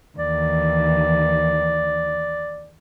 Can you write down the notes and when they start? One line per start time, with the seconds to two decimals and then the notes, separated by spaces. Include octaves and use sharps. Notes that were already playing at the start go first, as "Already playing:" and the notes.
0.18 D#2 E3 D5